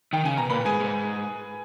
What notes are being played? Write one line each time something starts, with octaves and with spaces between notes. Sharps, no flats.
D#3 G5
C#3 G#5
B2 A#5
A#2 B4 B5
A#2
G#2 G#4 G#5
G#2